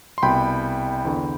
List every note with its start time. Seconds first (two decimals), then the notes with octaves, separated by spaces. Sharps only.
0.18 C6
0.22 C2 B2 G5 B5
1.05 E2 D3